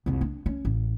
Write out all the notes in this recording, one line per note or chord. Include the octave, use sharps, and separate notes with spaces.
C2 F2
D4
C#4
A1